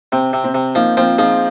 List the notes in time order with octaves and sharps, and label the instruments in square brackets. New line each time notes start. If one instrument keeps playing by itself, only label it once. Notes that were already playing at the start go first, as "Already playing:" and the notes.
[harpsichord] C3 [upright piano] C4
[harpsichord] C3
[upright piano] C4
[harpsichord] C3
[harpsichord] F3 [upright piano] A#3 D#4
[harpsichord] F3 [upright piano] C4 F4
[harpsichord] F3 [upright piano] D#4 G#4